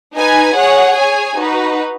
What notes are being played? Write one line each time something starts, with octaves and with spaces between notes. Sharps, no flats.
D#4 B4 G#5
G#4 C#5 F#5
G#4 C#5 G#5
D#4 F#4 B4